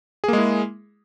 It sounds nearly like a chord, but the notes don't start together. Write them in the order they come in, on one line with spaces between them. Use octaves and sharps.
G#4 A#3 G#3 E4